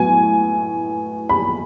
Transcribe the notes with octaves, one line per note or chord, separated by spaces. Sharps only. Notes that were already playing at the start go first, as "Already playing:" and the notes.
Already playing: A2 F#3 B3 G#5
B5